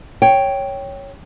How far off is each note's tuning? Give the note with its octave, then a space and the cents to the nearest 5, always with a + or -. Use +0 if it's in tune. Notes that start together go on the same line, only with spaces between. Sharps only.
C#5 +0 G5 +0